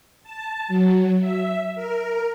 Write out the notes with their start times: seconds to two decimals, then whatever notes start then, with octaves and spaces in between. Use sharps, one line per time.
0.23 A5
0.68 F#3
1.20 E5
1.75 A#4